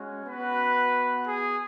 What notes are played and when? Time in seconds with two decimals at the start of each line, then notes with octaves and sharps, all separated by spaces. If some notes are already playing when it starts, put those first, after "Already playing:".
Already playing: G#3 C#4 F#4
0.25 B3 F#4 B4
1.24 G#4